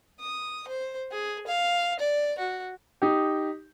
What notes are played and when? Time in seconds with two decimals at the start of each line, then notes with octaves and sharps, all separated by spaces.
0.20 D#6
0.67 C5
1.11 G#4
1.46 F5
1.99 D5
2.38 F#4
3.02 D#4 G4